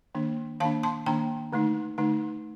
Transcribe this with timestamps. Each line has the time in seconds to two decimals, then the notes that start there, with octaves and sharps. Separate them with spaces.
0.15 D#3 A#3 D4
0.60 D#3 A#3 D4 F5 A5
0.83 A5 C6
1.06 D#3 A#3 D4 G5 A#5
1.53 D3 A3 D#4
1.98 D3 A3 D#4